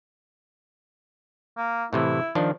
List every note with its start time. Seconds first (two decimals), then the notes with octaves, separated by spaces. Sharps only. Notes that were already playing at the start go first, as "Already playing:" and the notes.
1.57 A#3
1.93 A2 C3 E3 E4
2.35 D#3 F3 D4